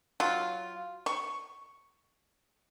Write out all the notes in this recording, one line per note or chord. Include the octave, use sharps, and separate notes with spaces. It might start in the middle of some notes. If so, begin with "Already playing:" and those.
F#3 F4
C#6